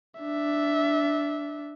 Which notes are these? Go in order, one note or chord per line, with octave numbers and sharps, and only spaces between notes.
D4 E5